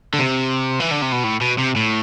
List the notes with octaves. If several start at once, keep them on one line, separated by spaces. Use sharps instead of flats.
D3
C3
E3
D3
C3
B2
A2
B2
C3
A2